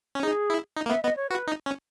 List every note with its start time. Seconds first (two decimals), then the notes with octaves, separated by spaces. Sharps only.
0.15 C#4
0.23 D#4 G#4
0.50 E4
0.77 D#4
0.86 A#3
0.89 B3 E5
1.03 B3 D#5
1.16 C#5
1.30 F#4 B4
1.47 D#4
1.66 C#4